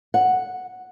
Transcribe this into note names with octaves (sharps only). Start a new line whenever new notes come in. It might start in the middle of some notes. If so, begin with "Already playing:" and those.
F#5